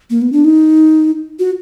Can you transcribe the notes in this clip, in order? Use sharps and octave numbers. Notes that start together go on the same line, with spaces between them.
A#3
B3
D4
D#4
F#4